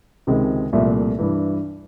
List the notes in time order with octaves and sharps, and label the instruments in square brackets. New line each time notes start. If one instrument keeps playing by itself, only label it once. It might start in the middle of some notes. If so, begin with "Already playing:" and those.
[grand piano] C#2 C3 D#3 G#3 C4
C2 A#2 F3 A3
G2 E3